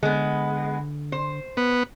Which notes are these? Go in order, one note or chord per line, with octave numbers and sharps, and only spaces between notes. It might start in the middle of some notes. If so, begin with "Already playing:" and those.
D3 G#3 B3
C5
B3